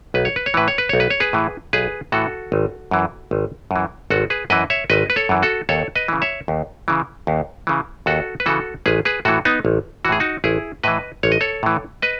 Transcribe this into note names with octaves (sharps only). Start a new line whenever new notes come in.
B1 B4
C#5
B4
C#5
A2 E3 B4
C#5
B4
B1 C#5
B4
C#5
G#4 B4
A2 E3
B1 G#4 B4
A2 E3 F#4 A4
G#1
F#2 E3
G#1
F#2 E3
G#1 F#4 A4
G#4 B4
F#2 E3 B4 D#5
C#5 E5
G#1 B4 D#5
B4
A4 C#5
F#2 E3
F#4 A4
D#2 A4 C#5
B4 D#5
C#3 E3
C#5 E5
D#2
C#3 E3
D#2
C#3 E3
D#2 F#4 A4
B4
C#3 E3 F#4 A4
A1 G#4 B4
G#4 B4
A2 E3 F#4 A4
B3 D#4
A1
A2 E3 F#4 G#4
D#4 F#4
A1 E4 G#4
A2 E3 B4 D#5
A1 C#5
D#5
A4 C#5
A2 E3
B4 D#5